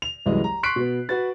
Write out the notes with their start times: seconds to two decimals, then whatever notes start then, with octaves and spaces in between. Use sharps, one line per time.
0.02 F7
0.26 C2 F#2 E3 G#3 D#5
0.44 A#5
0.63 C6 C#6 F#6 B6 C7 D7
0.76 B2 B3
1.09 F#4 B4 A6